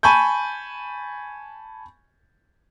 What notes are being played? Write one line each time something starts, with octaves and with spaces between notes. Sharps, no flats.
G#5 A5 B5 C#6 G6